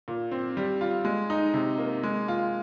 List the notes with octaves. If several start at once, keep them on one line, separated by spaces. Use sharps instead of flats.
A#2
C4
G3
F4
G#3
D#4
C3
A#3
G#3
F4